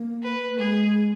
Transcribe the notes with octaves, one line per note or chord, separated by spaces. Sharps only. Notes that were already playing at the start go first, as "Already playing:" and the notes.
Already playing: A#3
B4
A#3
G#3 G#4